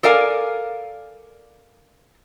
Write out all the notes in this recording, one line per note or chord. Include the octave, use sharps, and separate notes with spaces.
A4 A#4 D5 F5 G#5